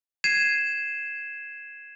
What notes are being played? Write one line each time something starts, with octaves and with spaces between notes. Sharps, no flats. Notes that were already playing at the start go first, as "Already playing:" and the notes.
G#6 C7 D#7 E7